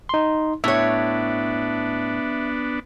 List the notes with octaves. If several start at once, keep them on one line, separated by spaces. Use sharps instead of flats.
D#4 C6
A2 B3 D4 C#5 E5